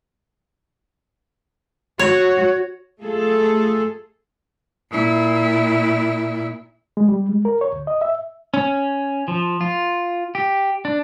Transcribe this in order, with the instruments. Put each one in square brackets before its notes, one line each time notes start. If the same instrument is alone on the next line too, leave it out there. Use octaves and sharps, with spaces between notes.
[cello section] F#4 [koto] C#5
[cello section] A3 F4 G#4 A4
[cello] A#2 E4
[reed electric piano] G#3
G3
G#3
A#4
C#5
D2
D#5
E5
[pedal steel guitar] C#4
F3
F4
G4
D4